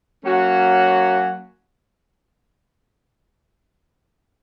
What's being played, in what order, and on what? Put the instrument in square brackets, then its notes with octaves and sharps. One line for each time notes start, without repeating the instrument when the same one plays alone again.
[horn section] F#3 A#3 C#4 F#4